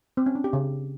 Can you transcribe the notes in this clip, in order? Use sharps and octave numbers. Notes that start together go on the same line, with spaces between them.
C4
C#4
D4
G4
C#3